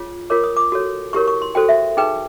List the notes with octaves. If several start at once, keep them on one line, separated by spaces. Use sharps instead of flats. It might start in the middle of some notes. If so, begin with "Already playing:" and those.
Already playing: F4 G#4 C#5
F4 A#4 C#5 D6
D#6
D6
F#4 A4 C#5
E4 G4 A#4 C#5 C#6
C#6
C6
F#4 A4 C5 G5
E5
D#4 G#4 B4 G5